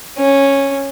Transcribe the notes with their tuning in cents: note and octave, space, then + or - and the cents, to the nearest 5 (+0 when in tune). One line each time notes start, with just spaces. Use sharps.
C#4 -10